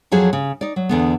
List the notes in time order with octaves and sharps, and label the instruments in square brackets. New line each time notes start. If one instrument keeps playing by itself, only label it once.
[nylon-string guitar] F2 F3 F#3 G#4
C#3
D#4 D5
F#3
E2 D3 B3